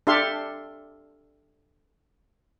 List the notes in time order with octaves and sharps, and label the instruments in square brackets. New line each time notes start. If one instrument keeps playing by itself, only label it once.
[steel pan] D4 G4 A4 E5 F5 C6